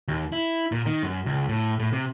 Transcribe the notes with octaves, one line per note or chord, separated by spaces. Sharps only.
D#2
E4
A#2
D#3
F#2
C#2
A2
A2
C3